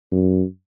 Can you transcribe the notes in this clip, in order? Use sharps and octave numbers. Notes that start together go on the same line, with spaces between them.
F#2